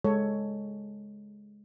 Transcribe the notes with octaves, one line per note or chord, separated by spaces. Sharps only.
G#3 A4 C#5